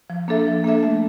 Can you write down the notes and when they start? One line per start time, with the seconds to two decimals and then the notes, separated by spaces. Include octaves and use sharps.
0.10 F3
0.28 A#3 D4 A4 E5
0.47 F3
0.64 A#3 D4 A4 E5
0.83 A3